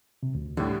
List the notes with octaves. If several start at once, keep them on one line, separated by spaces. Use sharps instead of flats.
C3
D2
A2 D3 G3